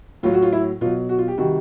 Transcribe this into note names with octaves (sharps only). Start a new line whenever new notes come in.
A2 F#3 F4
F#4
F4
E4
B2 F#3 F4
F#4
F4
G4
C3 D#3 G3 F#4